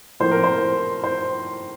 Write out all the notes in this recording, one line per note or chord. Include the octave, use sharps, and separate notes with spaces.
A2 F3 A#3 C5
A#4
C5
C5